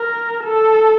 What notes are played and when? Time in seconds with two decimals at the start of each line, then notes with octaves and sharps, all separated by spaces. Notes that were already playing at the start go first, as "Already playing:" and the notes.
Already playing: A#4
0.44 A4